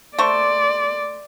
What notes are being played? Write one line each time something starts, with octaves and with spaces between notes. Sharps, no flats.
A3 C5 D5 C#6